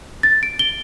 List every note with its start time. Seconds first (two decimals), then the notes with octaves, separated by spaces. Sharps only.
0.23 A6
0.43 D7
0.59 G7